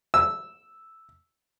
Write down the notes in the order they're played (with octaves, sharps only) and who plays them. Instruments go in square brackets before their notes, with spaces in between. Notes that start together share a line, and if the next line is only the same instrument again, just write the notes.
[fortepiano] E6